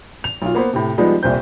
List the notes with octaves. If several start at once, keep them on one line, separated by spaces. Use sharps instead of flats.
F7
B1 F4
A#3 B3 B4 C5
A2 C3
F3 G3 G#3 B3 D#4
D#1 C2 A#2 C5 G6